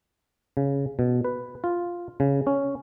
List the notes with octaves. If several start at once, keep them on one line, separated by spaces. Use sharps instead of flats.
C#3
B2
B4
F4
C#3
C#4